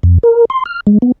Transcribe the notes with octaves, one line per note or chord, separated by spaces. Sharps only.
F2
A#4
C6
F6
G#3
B3